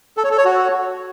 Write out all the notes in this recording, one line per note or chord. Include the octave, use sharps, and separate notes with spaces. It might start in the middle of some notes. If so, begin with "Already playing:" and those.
A4
C#5
A4
C#5
F#4